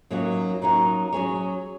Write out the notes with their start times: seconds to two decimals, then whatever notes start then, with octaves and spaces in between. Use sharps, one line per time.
0.10 F#2 F#3 A#3 D#4 F#4
0.62 F#2 F#3 A#3 D#4 F#4 A#5
1.12 F#3 C#4 G#4 C#5